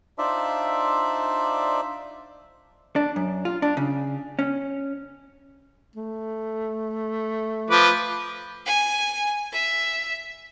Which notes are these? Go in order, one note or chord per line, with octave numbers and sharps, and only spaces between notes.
D4 D#4 F4 C5 D5 E5
D4
F#2
F4
D4
C#3
C#4
A3
F3 B4 D6
G#5
E5